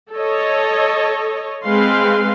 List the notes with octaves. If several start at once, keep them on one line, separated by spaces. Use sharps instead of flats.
A4 C#5 D#5
G#3 C4 B4 F5 C6